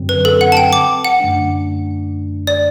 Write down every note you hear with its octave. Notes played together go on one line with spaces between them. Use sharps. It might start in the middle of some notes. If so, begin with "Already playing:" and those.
Already playing: F#2 D3 F#3 C4
B4
A4
F#5
A5
G5
D6
F#5
F#2 D3 A3 D4
D5